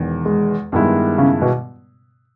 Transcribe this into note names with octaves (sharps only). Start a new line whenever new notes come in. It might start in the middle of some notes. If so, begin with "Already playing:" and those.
Already playing: E1 E2 D#3
G#3
G2 D#3 G#3 B3 E4
C#3
B2